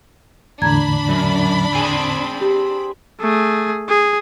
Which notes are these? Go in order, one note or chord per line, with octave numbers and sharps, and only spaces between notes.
E2 A2 D3 D4 A#5 B5 G#6
F#2
C4 G#4 G#5
G4
A3 G#4
G#4